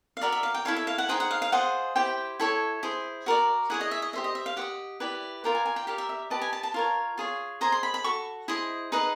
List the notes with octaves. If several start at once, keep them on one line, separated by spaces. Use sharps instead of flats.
F5
F#4 A#4 D5 E5
E5
F5
G5
E4 A4 C#5 F5
E5
F5
F#5
D#4 G#4 C5 G5
F#5
F5
F5
F4 G#4 C5 D#5 F#5
E4 G4 C5 G5
E4 A4 C#5
E4 G#4 C5
F#4 A#4 D5
E4 G#4 C#5 F#5
D#5
E5
D#5
G4 C5 D#5 E5
D#5
E5
F5
G4 C5 D#5 F#5
E4 G4 B4 D5
F4 A#4 D5 G5
G#5
G#5
G5
G4 A#4 D5 F5
E5
E5
G4 B4 D#5 A5
G#5
A5
A5
F4 A#4 C#5
F4 G#4 C#5
G#4 C5 D#5 A#5
C6
B5
B5
F#4 A4 C#6
E4 G#4 C5 D#5
D#4 G#4 B4 D#5